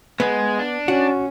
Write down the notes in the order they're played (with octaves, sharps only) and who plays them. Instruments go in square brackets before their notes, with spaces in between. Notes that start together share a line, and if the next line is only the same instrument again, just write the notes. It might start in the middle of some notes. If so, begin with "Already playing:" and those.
[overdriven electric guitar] G#3 [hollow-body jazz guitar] B3
[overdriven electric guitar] D4
[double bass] C#4 [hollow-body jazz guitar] F#4